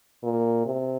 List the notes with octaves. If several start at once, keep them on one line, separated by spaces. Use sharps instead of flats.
A#2
C3